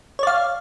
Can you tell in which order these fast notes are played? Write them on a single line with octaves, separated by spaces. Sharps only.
C#5 D5 F5